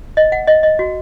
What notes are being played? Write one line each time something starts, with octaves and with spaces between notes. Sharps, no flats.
D#5
F#5
D#5
D#5
F#4